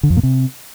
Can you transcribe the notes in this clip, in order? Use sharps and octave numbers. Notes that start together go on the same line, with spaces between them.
D3
F2
A#2
C3